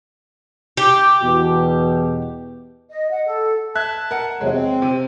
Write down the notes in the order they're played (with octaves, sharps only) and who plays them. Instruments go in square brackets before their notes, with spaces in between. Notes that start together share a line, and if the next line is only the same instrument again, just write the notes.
[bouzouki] G4
[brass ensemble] E2 B2
[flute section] D#5
F#5
A4
[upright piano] E5 F#6 G#6 [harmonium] A5
[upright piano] A#4 F#5
[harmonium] E2 C3 F#3 [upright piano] G#3
[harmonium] C4
[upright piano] C3